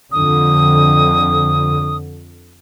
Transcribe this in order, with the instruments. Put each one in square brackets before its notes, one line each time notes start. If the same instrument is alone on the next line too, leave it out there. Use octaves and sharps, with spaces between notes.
[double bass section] F2 D3 [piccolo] D#6